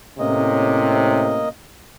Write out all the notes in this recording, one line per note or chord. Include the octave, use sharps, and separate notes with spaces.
A2 C3 A#3 C#4 D#5